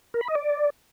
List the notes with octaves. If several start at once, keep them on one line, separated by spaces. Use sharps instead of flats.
A#4
B5
D#5
D5